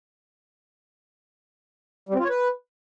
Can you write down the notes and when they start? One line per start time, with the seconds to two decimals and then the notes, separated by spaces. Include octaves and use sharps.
2.09 G3
2.14 C4
2.19 F4
2.24 C#5
2.30 B4